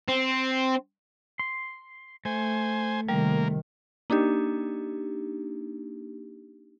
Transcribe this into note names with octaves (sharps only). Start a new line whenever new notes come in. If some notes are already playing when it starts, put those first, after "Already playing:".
C4
C6
A3 C5 G#5
C3 D#3 G3 A#3 A#4
A#3 D4 D#4 G4